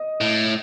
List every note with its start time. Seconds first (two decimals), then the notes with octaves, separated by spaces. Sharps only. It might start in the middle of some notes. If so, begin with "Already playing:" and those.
Already playing: D#5
0.21 A2